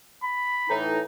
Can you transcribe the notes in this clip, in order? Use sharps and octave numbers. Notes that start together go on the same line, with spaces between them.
B5
A2 E3 D#4